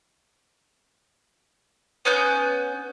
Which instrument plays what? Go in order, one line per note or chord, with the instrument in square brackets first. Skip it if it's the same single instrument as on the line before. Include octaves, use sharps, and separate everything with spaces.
[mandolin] B3 C#4 F#6 G6